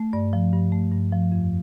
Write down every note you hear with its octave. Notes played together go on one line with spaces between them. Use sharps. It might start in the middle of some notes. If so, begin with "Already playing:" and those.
Already playing: A3
G2 D5
F3
G2
A3
G2
F3
F2